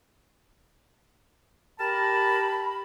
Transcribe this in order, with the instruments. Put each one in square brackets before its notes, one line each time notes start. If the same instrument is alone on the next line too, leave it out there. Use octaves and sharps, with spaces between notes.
[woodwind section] G4 A#4 [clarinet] A5 [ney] B5